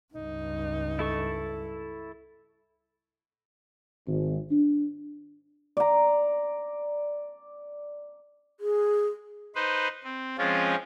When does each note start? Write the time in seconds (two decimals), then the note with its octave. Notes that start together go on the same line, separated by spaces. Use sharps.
0.14 C#2 G2 D#4
0.99 E4 A4 C#6
4.08 G#1
4.51 D4
5.77 D5 A#5
8.60 G#4
9.55 D#4 B4 C5
10.03 C4
10.38 F3 G#3 C4 C#4 F4